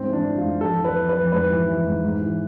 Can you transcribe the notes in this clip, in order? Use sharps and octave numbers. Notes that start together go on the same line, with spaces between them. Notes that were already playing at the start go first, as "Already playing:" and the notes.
Already playing: G#2 C4
E3 D4
E3
G#2 F4
F2 A4
E3
B4
E3
B4
F2
G#2 B4
E3
E3
G#2
G#2
E3